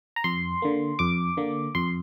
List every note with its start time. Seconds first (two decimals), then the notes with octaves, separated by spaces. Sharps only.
0.16 A#5
0.24 F2 C6
0.62 D3 A#3
0.99 F2 D6
1.37 D3 A#3
1.75 F2 C6